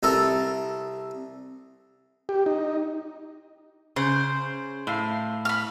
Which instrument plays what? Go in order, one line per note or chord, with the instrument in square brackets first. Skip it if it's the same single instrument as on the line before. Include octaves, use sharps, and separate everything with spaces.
[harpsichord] C2 A4 A#4 A5
[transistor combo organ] G4
D#4
[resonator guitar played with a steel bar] C#3 [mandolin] C5
[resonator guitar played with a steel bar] A2 F5
[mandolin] B5 F6